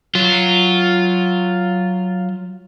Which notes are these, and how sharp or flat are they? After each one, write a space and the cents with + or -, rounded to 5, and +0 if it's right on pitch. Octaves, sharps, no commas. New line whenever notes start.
F#3 +0 F4 +0